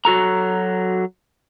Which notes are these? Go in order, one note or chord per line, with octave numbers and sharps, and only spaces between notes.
F#3 F#4 A4 A#5